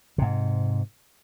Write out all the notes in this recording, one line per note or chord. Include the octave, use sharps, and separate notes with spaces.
G#2 C3